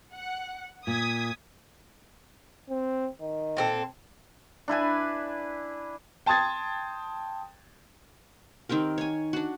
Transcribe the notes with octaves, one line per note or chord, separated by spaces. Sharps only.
F#5
A#2 D#6 G#6 B6
C4
D#3
A#2 C4 A4
D4 E4 B4 G#5
G5 A5 C6 D#6 G#6 A6
D#3 C4 G4 A#4
C#5 G#5
D4 F#4